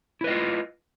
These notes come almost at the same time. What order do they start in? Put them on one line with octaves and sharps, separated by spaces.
E4 B4 D#5 F4